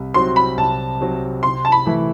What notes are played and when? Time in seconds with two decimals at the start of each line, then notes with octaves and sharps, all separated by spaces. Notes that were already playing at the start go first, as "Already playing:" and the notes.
Already playing: C2
0.14 C3 F#3 C4 F#4 C6
0.36 B5
0.57 C2 A5
1.01 C3 F#3 C4 F#4
1.43 C3 C6
1.65 A5
1.72 B5
1.86 E3 A3 E4